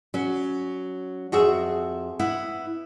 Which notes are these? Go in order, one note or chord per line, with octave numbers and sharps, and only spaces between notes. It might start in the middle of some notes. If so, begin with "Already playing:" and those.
F#3 C#4
F2 F#4 G#4 E5
B3 E4 F#5